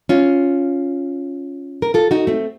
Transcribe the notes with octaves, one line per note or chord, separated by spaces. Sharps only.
C#4 F4
A#4
F4 A4
D#4 F#4
A3 C4